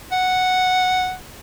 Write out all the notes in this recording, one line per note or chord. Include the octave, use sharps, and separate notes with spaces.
F#5